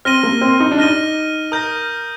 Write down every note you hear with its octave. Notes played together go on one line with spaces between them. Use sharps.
C4 F6 A#6 D#7 G7
A#3
C4
D#4
D4
D#4 F6 A#6 D#7 G7
A#4 D#6 G6 A#6